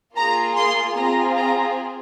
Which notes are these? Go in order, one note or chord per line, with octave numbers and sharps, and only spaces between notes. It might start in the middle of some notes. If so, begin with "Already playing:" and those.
A#3 F4 G#4 A#5
C6
C4 F4 G#4 A#5
A#5